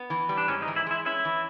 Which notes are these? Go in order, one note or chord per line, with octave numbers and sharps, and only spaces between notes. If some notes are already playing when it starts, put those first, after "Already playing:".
Already playing: B3
E3
G3
D4
G#2 C#4
D#4
E3
E4
G#3 E4
C#4 E4
E3